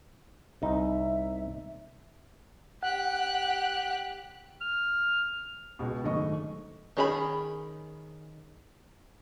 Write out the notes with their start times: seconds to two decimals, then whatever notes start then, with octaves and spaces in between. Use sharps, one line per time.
0.62 C2 D#4 E5
2.83 G4 F#5 F#6
4.61 F6
5.79 C#2 B2
6.04 G#1 F#2 A3 D#5 C#6
6.97 D#3 C#4 G#4 A#5 B5